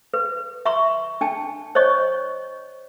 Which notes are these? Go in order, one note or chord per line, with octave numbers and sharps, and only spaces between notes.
B4
E5 A#5 C6 C#6
D4 G5 A5
C5 C#5 D#5 C#6